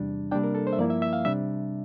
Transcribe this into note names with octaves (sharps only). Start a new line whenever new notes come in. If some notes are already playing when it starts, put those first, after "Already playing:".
Already playing: E2 C3 G3 D4
C3 G3 A#3 D4 G5
A#4
A4
C5
E5
G2 F3 A#3 E4 D5
E5
E5
F5
C3 G3 D4 E5